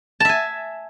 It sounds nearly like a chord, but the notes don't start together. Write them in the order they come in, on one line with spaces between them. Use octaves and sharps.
A5 E5 G#5